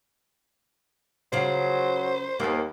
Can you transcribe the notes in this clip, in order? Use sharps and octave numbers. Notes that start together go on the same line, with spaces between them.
C#3 F#3 F4 C5
D#2 A#3 B3